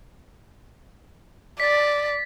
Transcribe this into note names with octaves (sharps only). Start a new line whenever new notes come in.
D5 A6 B6